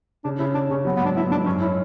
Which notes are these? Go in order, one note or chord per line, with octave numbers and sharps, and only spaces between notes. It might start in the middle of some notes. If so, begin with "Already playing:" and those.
C#3 D4
C#3 E4
C#3 D4
C#3 C#4
F#3 B3
B3
G#2 D4
B3 E4
G#2 D4
F#2 C#4
C#4 E4